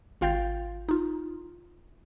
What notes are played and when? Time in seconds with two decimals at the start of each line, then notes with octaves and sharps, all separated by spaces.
0.21 G#1 F4 F5 G5 G6 A6
0.89 D#4 F4